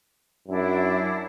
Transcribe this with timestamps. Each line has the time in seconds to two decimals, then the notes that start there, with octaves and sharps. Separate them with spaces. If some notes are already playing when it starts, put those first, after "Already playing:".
0.48 F#2 D4 E4